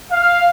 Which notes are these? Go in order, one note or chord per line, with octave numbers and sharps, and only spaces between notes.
F5